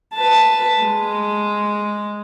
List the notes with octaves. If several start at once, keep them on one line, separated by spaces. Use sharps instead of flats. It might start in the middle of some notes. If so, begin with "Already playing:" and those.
B4 A5
G#3